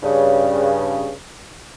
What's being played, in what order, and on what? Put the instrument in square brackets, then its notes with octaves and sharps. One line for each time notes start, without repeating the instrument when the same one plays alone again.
[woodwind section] G2 C#3